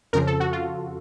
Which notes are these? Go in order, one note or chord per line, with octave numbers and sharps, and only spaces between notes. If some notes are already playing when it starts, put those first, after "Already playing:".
F2 C#3 F3 A#4
A4
F#4
F4